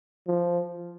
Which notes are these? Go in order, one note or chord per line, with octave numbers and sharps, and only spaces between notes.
F3